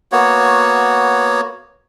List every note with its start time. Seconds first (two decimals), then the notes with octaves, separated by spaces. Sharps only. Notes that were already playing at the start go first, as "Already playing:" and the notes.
0.12 A#3 B3 F#4 C#5